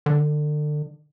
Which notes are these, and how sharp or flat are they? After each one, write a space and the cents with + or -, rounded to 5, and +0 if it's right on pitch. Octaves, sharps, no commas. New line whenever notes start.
D3 +30